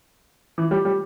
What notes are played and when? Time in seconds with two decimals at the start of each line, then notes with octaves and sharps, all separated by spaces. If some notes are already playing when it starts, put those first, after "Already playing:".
0.58 E3
0.71 G3
0.85 G3